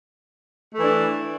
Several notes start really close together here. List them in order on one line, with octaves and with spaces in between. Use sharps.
A3 E3 D4